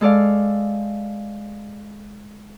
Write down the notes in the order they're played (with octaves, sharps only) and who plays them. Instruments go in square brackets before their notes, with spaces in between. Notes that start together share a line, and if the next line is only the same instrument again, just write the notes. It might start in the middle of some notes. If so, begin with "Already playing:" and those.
[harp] G#3 A4 D5 F5